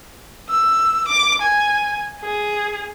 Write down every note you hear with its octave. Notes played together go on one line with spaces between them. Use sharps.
E6
D6
G#5
G#4